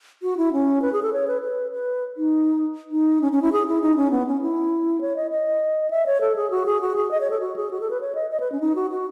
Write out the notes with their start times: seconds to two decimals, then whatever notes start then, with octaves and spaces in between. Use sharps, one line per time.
0.22 F#4
0.37 E4
0.53 C#4
0.82 B4
0.93 G#4
1.03 A4
1.13 C#5
1.28 B4
1.42 B4
1.72 B4
2.17 D#4
2.92 D#4
3.21 C#4
3.32 C#4
3.42 E4
3.52 G#4
3.67 E4
3.82 D#4
3.97 C#4
4.11 B3
4.27 C#4
4.41 E4
5.01 C#5
5.16 D#5
5.31 D#5
5.90 E5
6.06 C#5
6.21 A4
6.36 G#4
6.51 F#4
6.66 G#4
6.81 F#4
6.96 G#4
7.11 D#5
7.20 C#5
7.30 A4
7.40 F#4
7.56 G#4
7.71 F#4
7.81 A4
7.90 B4
8.01 C#5
8.15 D#5
8.30 D#5
8.40 B4
8.52 C#4
8.60 D#4
8.75 F#4
8.91 F#4